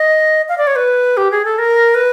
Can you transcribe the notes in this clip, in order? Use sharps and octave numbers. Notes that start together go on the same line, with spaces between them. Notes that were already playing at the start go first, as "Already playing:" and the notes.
Already playing: D#5
F5
D5
C#5
B4
G4
G#4
A4
A#4
B4